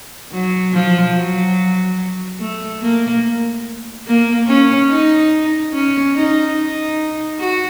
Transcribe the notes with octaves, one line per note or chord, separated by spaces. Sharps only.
F#3
F3
F#3
A3
A#3
A#3
C#4
D#4
C#4
D#4
D#4
F#4